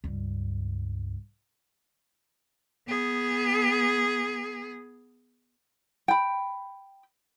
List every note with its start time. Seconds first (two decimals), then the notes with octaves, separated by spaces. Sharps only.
0.04 C#2 G2
2.88 B3 G#4
6.08 G5 B5